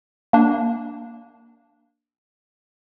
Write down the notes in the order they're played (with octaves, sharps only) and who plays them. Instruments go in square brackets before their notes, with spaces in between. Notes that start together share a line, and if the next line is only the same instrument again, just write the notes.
[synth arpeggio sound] A#3 D4